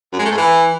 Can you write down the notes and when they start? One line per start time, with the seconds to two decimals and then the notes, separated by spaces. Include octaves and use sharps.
0.13 F#2
0.19 G#3
0.25 A3
0.31 G#2
0.37 E3